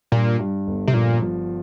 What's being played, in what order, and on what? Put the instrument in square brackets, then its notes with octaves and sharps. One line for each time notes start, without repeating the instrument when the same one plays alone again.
[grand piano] G2 [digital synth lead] A#2
[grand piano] G2
G1
[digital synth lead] C3
[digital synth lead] A#2 [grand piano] F3
[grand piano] F3